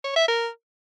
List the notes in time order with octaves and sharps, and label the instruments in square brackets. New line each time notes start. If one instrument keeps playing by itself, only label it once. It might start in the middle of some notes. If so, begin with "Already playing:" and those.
[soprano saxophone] C#5
E5
A#4